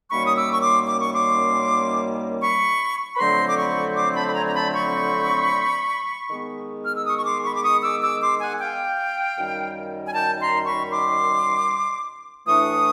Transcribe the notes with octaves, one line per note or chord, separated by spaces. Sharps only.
F#2 D#3 G3 A#3 C#4 B5 C#6
D#6
D6 E6
C#6
C6 D6
D6
C#6
C6 D6
B5 C#6
B5
F2 D3 F#3 A3 C4 A#5 C6
D6
B5 C#6
C6 D6
A5 B5
B5
G#5 A#5
A#5
A5 B5
B5 C#6
D#3 G#3 B3
F6
E6
C#6 D#6
C#6
C6 D6
B5 C#6
D6
C#6 D#6
D6 E6
D6 E6
C6 D6
F#5 G#5
F5 G5
F#2 D#3 G3
G#5
G5 A5
A#5 C6
B5 C#6
C6 D6
A2 E3 A3 D4 C#6 D#6